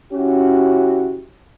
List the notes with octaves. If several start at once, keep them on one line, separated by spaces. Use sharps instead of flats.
C#3 C#4 E4 F#4 G4